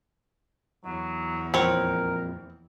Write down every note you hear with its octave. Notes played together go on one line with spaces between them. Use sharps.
E2 F#3
F2 A#2 C4 A#4 C#5